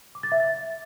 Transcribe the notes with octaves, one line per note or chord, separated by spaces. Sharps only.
D6
A6
E5
A6